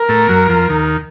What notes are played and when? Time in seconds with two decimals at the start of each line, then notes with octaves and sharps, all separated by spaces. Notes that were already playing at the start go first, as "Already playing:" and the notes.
Already playing: A#4
0.09 A2 A3
0.29 F#2 F#3
0.49 F2 F3
0.69 D#2 D#3